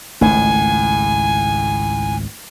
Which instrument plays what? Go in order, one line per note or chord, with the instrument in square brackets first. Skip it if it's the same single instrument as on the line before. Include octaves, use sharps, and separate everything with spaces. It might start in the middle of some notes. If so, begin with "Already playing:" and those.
[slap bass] G#1 C#2 [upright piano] A2 [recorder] G#5